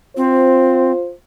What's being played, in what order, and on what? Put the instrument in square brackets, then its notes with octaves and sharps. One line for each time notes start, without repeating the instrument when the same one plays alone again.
[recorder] C4 [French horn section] F4 C5